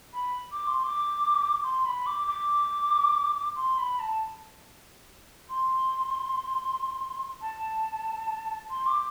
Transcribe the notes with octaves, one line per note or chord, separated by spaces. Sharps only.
B5
D6
C6
D6
C6
B5
D6
D6
C6
B5
A5
C6
A5
C6
D6